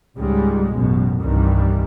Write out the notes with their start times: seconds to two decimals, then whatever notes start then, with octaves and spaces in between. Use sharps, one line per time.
0.18 C#2 G#2 G3 G#3
0.74 A1 F#2 B2
1.22 C2 G2 D#3 E3 G3